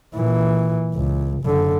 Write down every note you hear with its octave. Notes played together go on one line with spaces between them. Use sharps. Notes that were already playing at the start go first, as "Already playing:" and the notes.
A#2 E3
C#2
F#1 D3